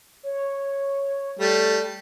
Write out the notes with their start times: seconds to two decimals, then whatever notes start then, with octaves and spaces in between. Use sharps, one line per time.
0.23 C#5
1.39 G3 A3